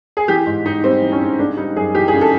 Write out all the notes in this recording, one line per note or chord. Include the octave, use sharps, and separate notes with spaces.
G#4
E3 G4
G#2
G#2 D#4
G3 C4
E3
C#4
G#2
C#3 D4
G3 D#4
F#2 G#4
E3 G4
G#4
C#3
A4